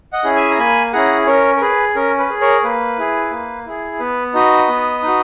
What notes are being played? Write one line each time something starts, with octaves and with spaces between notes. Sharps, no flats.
D#5 F#5
C#4 E4 G#4
E5 G#5
A#5
A#3 G#5 B5
C#4 E4 G#4 F#5 A#5
C#4 A#4 C#5
A#4
G#4 B4
C#4 A#4
B4
G#4
A#4 C#5
A#3 B4
E4 G#4
A#3
E4 G#4
B3 B4
D#4 F#4 B4 D#5
B3
D#4 F#4